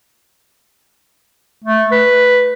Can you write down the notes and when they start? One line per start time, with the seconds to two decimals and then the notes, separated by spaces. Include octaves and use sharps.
1.64 A3
1.92 B4